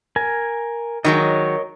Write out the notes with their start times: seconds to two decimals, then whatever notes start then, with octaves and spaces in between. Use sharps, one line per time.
0.16 A#4 G#5
1.05 D#3 F#3 G#3 A#4 C#5 D#5